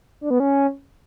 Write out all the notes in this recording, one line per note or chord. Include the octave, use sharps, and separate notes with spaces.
D4
B3
C#4